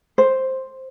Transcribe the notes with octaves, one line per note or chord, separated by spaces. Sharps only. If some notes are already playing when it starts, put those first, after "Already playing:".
C5